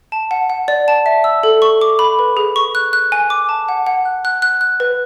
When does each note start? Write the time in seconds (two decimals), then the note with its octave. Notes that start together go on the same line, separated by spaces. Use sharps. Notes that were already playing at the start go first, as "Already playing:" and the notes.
0.12 A5
0.31 F#5
0.50 F#5
0.68 D5
0.88 A5
1.06 E5
1.24 E6
1.43 A4
1.62 C#6
1.81 D6
1.99 B5
2.19 B4
2.37 G#4
2.56 C#6
2.75 F#6
2.93 F#6
3.12 G#5
3.30 D6
3.49 A5
3.69 F#5
3.87 F#5
4.05 F#6
4.25 F#6
4.42 F#6
4.61 F#6
4.80 B4